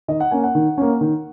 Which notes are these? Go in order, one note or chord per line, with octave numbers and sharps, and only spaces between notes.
D#3 D#5
F#5
A#3 C#4 G#5
F#5
D#3
A#3 C#4
D#3